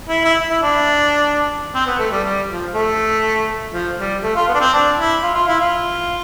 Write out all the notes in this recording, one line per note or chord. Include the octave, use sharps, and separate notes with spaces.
E4
E4
E4
D4
C4
B3
A3
G3
G3
F3
A3
F3
G3
A3
F4
B3
D4
C4
D4
E4
F4
F4
E4
F4